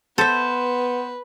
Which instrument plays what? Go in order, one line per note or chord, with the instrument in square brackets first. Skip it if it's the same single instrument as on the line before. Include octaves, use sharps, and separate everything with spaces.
[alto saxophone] B3 [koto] A4 E5 [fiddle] B4 [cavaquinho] C5